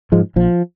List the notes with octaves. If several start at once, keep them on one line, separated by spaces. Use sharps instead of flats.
G#2 F3 G#3
A#1 F3